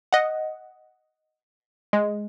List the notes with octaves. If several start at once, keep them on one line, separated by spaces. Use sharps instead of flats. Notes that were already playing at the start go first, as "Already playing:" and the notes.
D#5 F#5
G#3